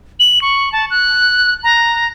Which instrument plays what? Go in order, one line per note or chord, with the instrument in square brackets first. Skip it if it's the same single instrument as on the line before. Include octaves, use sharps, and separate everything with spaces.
[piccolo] F#7
C#6
A5
F#6
A#5